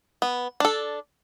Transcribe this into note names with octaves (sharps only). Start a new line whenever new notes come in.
B3
D4 A4